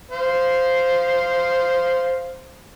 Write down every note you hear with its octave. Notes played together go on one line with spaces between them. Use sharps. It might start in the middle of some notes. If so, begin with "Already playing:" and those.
C5 F5